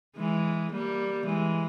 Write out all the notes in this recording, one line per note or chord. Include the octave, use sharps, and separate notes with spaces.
E3 G#3
G3 A#3
E3 G#3